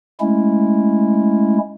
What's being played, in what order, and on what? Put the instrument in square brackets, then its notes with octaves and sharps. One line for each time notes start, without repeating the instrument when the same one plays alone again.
[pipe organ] G#3 A3 C#4 E4